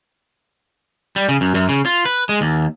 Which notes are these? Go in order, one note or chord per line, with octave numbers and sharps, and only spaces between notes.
G3
C#3
F#2
F#2
C#3
F4
B4
G#3
D#2